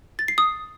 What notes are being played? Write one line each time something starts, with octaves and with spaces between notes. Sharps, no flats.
A6
C7
D#6